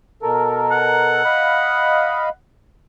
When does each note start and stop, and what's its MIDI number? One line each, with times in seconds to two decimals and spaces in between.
0.22 1.22 47
0.22 1.22 69
0.22 1.22 70
0.71 2.33 78
1.25 2.29 75
1.25 2.29 77
1.25 2.29 83